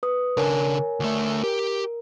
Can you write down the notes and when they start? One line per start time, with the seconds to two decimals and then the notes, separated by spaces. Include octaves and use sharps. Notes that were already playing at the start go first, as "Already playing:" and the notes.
0.03 B4 D#6
0.37 C#3 D4 A#4 C#5 G#5
1.00 D2 A3
1.44 G4 A#4